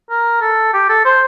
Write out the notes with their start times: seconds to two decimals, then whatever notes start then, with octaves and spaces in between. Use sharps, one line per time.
0.10 A#4
0.41 A4
0.73 G4
0.89 A4
1.05 C5